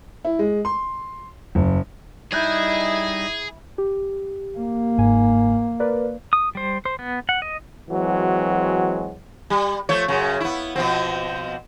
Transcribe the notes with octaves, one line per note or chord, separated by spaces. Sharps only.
E4
G#3
C6
F#1
G3 D#4 E4 G#4 D#5 F#6 G6
G4
A#3
G1 G#2 G#5
A#4 B4 D5
D#6
G3 C5
C5
B3
F#5
D#5
E3 F#3 G#3 C4 F#4
G3
F3 A3 C#5
F#2 C#3
B3 E4
B2 F3 C4